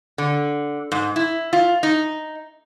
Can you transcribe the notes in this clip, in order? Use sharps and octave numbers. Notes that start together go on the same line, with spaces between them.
D3
G#2
E4
F4
D#4